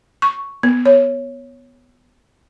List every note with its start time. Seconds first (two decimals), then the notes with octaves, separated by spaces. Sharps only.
0.22 C#6
0.63 B3
0.86 C#5